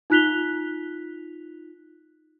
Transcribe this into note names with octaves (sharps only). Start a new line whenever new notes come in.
D#4 F4 F#6 B6 F7 G7